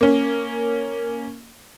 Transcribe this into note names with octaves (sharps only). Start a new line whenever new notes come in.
A#3 C#4